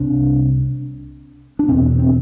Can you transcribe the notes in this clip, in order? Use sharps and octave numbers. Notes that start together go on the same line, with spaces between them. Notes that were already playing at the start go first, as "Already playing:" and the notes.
Already playing: C2 C3 D4
D4
E2 B2 C4
C4